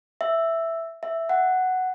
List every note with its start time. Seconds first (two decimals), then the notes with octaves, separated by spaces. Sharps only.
0.21 E5
1.03 E5
1.29 F#5